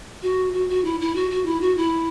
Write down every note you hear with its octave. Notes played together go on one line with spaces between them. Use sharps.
F#4
F#4
F#4
E4
E4
F#4
F#4
E4
F#4
E4